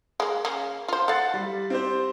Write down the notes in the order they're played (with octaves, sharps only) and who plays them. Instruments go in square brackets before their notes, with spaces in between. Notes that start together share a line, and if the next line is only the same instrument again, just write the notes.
[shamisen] G#3 A#3
C#3 A#3
F4 C5
[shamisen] A4 F5 [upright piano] F#5 A6
[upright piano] G3
C4 G4 C5